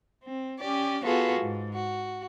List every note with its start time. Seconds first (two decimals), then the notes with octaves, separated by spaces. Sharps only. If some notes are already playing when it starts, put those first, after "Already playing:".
0.25 C4
0.59 C#4 G4 D5
1.04 B3 F4 F#4 G#4 A4 B4
1.41 G#2
1.73 F#4